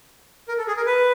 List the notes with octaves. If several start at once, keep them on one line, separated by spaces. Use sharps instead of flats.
A#4
A4
G#4
A#4
B4